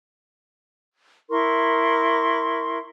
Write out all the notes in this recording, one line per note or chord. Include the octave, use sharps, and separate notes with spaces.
E4 A#4 C6 C#6